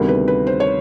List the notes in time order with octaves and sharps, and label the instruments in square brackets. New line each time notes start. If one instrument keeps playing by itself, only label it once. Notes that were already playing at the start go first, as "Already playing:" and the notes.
Already playing: [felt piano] D2 C3 D#3 G3 B3 A#4
B4
B4
C5
C#5